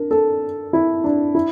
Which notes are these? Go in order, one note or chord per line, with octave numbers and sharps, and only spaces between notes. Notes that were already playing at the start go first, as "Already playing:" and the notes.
Already playing: D4 A#4
A4
E4
D4
E4